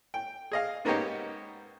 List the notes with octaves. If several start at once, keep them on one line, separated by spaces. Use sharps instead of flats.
G5
G#4 D#5 F5
G#2 A#3 B3 C#4 D#4 G4